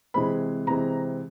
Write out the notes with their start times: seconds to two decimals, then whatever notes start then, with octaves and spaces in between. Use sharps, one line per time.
0.14 C3 E3 G#3 C4 B5
0.67 C3 E3 G#3 C4 A#5